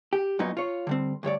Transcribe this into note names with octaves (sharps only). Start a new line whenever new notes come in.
G4
F#2 A#2 F#3 B3 D#4
F4 C#5
D3 G3 C4
D2 G2 C#5 D5